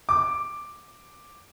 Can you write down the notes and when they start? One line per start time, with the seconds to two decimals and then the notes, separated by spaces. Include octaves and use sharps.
0.09 D6